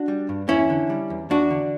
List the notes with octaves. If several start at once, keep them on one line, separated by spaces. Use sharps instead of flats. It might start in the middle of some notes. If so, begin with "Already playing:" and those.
Already playing: D4 F#4
G3
G2
E2 C#4 E4
D3
G3
E2
E2 D4 F#4
D3